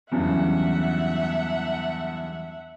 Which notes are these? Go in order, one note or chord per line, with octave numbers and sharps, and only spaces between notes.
E2 G2 C#3 E3 F#3 E5 F#5